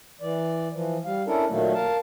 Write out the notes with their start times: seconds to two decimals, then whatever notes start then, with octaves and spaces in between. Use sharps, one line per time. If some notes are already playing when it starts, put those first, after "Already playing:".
0.21 E3 D5
0.72 E3 F3
1.05 G3 F5
1.27 C#4 D4 E4 A4 A#4
1.49 A#2 D#3 F#3 A3 A#3
1.74 A#4 F5 A5